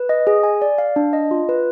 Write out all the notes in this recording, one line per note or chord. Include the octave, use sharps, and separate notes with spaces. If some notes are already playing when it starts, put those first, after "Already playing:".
Already playing: B4
D#5
G#4
G#5
D5
F5
D4
D#5
F4
B4